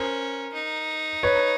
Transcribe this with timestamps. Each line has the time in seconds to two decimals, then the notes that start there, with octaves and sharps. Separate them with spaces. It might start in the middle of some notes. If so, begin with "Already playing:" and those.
Already playing: C#4 A#4 C5
0.54 D#4
1.23 B4 C#5